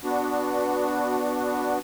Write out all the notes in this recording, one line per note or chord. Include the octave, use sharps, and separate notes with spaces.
B3 D4 F#4